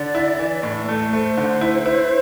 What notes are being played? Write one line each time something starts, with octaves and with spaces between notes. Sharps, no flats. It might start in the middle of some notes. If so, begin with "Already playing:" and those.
Already playing: D3 D5
E4
E3
A2
A3
A3 C5
D3
E4
E4